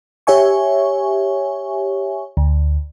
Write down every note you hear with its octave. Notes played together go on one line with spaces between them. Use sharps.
G4 C#5 E5 G#5 C#6
D2